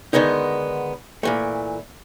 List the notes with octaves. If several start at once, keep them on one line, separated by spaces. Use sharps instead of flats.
D3 D#3 G#3 B3 D#4
A#2 E3 A3